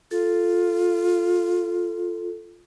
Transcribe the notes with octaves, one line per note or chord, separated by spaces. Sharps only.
F4 A4